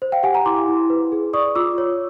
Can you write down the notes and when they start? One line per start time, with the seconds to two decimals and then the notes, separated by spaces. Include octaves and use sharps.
0.02 C5
0.12 F5 G5
0.23 G4 F#5 G#5
0.34 G#5 A#5
0.46 E4 C6 D6
0.68 E4
0.90 B4
1.12 G#4
1.33 D5 C#6 D#6
1.55 F4 D6 E6
1.78 C#5